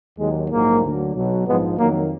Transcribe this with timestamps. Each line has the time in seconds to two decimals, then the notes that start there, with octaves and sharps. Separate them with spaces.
0.19 D#2 D#3 F#3 G#3
0.51 A#1 G#2 F#3 A#3
0.82 D2 D3 F#3
1.15 B1 B2 F#3
1.47 A#1 G#2 F3 G#3 B3
1.78 F2 D#3 F#3 A#3